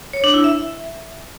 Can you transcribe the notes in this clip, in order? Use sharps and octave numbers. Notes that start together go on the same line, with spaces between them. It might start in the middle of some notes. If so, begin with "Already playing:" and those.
C#5
D4
E4
E5